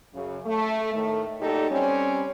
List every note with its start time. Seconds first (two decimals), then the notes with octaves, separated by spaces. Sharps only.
0.14 F#2 C#3
0.46 A3
0.93 A2 D#3 A3
1.40 A#2 F#3 D#4 G4 A4
1.70 G3 C4 C#4